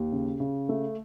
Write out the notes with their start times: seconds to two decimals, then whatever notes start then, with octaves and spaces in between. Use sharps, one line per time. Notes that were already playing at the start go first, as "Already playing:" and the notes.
Already playing: D#2
0.12 C#3
0.40 C#3
0.69 A3